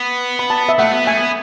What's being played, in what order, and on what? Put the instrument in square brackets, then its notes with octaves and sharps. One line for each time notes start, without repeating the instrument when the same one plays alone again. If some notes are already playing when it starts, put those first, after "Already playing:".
Already playing: [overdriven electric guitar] B3
[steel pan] B5
A5
E5
[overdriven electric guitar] A3 [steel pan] F#5
[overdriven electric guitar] B3
[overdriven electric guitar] A3 [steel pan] G#5
[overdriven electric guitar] B3